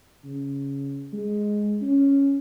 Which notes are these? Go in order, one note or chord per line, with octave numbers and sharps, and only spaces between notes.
C#3
G#3
C#4